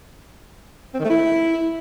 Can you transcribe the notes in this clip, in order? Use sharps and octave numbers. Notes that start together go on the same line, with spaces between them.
C4
D#3
A3
E4